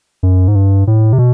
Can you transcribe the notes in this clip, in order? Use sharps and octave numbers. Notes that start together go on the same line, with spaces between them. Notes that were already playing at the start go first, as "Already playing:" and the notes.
F#2
G#2
G2
A2
C3
B2